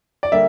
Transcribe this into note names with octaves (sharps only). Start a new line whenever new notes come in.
D5
D3 G3 A#3 E5